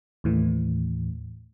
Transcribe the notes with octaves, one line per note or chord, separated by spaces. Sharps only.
D#2 A2 E3